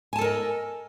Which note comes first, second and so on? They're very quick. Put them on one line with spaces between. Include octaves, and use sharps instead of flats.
G#5 A5 A4 A#4 D#5